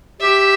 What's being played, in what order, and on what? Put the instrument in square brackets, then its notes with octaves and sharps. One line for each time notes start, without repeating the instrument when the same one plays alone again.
[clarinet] G4 [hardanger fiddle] E5